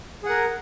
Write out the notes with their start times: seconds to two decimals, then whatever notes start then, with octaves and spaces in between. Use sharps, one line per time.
0.23 G#4
0.26 F#5
0.29 A#4